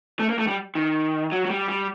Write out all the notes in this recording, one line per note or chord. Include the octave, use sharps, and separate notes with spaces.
A3
A#3
A3
G3
D#3
F#3
F#3
G3
G3